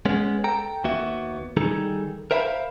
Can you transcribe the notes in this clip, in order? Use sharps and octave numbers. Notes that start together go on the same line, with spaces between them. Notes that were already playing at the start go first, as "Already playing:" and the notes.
G#3 B3 C#4
A4 G5 A#5
D#2 A#3 B3 F#4 E5
D#3 G3 D#4 G#4 A4
A#4 C5 E5 F5 G#5 B5